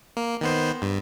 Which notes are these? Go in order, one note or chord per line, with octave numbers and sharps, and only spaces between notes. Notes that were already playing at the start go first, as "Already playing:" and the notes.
A#3
D#3 B3 C5
G2